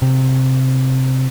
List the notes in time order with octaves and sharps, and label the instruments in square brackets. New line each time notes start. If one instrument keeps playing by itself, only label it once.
[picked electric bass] C3